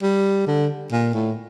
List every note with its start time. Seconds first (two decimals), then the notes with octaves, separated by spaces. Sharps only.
0.02 G3
0.47 D3
0.92 A#2
1.14 A2